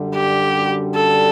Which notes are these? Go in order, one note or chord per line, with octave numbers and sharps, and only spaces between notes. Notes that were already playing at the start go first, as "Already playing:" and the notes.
Already playing: F#2 D3 G3
G4
A4